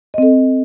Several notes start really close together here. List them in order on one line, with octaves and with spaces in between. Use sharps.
D#5 C4 A4